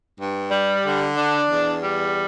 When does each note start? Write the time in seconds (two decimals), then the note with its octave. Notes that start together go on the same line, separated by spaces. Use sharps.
0.19 G2
0.51 G3
0.85 D3
1.17 D4
1.50 E2
1.83 G3